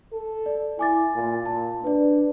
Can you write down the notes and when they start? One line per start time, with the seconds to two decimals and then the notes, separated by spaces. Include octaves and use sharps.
0.13 A4
0.46 D5
0.79 E4 G#5 D6 A6
1.15 A#2
1.46 A#2 A5
1.84 D4 B4 D5